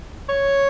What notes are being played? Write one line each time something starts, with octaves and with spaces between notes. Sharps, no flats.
C#5